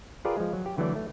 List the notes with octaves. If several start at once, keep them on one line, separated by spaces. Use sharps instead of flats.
F4 G4 G#4 A#4 B4 D5
F3 G#3
F#3
G4
D3 E3 F#3 A3 D5
A3